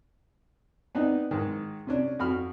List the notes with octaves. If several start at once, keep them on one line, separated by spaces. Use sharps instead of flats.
B3 C4 D4 D#4
G#2 D#3
C3 C#4 D4
F2 F#4 B5 F6